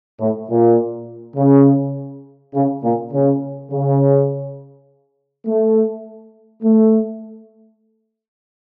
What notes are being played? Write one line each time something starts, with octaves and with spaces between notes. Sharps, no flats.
A2
A#2
C#3
C#3
A#2
C#3
C#3
A3
A3